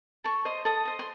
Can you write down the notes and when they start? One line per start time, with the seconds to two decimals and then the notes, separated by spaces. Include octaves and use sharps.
0.24 A4 C#6
0.45 C5 D#5 C6
0.65 A4 D#6
0.85 C5 D#5
0.99 C6